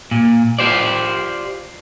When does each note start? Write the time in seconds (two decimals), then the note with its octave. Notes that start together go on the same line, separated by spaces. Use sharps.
0.11 A#2
0.59 F4 G4 C5 D5